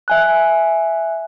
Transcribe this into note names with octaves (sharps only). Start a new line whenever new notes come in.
E5 G#5 F#6